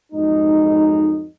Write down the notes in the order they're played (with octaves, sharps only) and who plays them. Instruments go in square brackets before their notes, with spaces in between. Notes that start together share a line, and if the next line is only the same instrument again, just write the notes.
[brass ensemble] F2 G#2 F#3 G#3 D#4